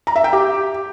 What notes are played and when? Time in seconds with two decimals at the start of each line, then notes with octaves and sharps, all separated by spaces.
0.07 A#5
0.16 E5
0.24 G5
0.33 G4